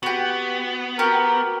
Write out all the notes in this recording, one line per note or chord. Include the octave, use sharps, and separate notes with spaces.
B3 F#4 G4
F#4 G4 A#4